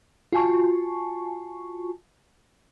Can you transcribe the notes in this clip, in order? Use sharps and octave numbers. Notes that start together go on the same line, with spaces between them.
F4 F#4 G#5 A5 C#6